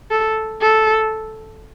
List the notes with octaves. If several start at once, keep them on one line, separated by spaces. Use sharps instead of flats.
A4
A4